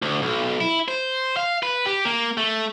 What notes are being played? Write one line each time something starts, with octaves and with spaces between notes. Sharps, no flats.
D2
B1
E4
C5
F5
B4
G4
A#3
A3